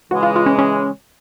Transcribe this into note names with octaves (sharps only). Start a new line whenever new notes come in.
C#3 E3 G#3 F#4
F4
F4
C#4
C#4